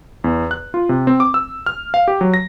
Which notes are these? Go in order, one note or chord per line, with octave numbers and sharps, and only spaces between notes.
E2
F#6
F4
C3
C4
D6
E6
F6
F5
G4
F#3
A#6